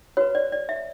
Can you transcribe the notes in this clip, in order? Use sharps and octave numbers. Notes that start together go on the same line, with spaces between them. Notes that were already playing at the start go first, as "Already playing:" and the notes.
F#4 B4 C#5
D5
D5
E5